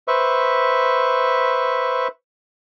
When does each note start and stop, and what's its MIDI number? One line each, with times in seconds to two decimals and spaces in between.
0.08 2.08 71
0.08 2.08 72
0.08 2.08 76
0.08 2.08 85